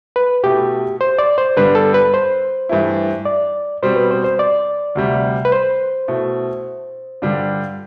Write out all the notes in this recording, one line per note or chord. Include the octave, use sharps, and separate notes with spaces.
B4
B2 A3 E4 G4
C5
D5
C5
G2 D3 G3 B3 D4 B4
A4
B4
C5
G2 E3 A3 E4
D5
B2 G3 C4 C5
B4
C5
C5
D5
D2 C3 G3
B4
C5
B2 A3 E4
G2 D3 G3 D4 F4